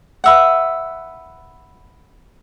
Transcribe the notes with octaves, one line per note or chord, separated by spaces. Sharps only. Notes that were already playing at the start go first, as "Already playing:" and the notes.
B4 E5 F#5